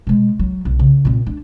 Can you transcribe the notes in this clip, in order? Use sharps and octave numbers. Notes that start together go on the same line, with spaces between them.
B2 G#3
F#3
B1
C#3
A#2 C4
D4